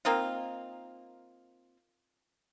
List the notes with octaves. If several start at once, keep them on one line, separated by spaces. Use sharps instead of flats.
A#3 C4 D#4 F4